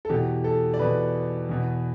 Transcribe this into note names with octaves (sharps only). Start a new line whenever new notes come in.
A4
E2 B2 G4
A4
D5
E2 B2 B4
E2 B2